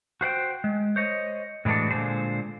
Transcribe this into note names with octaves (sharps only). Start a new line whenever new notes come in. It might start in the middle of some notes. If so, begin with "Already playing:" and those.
F#4 C5 F#5 G5
G#3
C5 C#5 D#5
A2 E3 G#3 D4 F#4
A#2 D3 G#3 C5